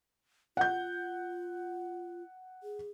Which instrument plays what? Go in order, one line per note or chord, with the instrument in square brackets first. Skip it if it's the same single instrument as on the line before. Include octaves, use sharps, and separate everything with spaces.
[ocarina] F4 [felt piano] F#5 G6
[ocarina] G#4